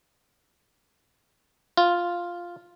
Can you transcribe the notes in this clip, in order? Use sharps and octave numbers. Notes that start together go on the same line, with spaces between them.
F4